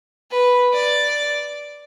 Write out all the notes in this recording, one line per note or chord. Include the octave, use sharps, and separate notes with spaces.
B4
D5